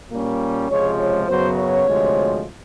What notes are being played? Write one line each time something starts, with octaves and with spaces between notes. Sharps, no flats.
A#2 G3 A#3 C#4
C#2 C3 F3 G#3 C#5
C#5
F#2 C#3 F#3 B3 C5
C#5
D2 C3 F3 G#3